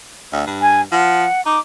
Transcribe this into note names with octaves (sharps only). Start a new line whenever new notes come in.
D2
G2
G#5
F3 F#5
D#4 D6